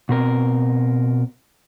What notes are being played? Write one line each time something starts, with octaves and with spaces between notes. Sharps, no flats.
B2 C4 A#4